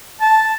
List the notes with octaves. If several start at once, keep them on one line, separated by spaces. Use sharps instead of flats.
A5